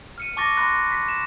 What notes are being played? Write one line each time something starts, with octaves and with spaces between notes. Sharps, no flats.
F6 C#7 D#7
A5 C#6 D6 A6 A#6 D#7
B5 C6 F#6 A#6
B6
E7